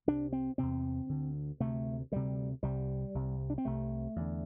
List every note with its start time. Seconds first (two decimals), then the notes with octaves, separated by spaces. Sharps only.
0.07 C2 C3 D4
0.33 C4
0.58 E2 C3 C4
1.09 D2 D3
1.60 D2 C3 A3
2.12 D2 C3 G3
2.63 C2 C3 G3
3.15 C2 C3
3.50 D4
3.58 C4
3.65 C2 C3 A3
4.16 E2 D3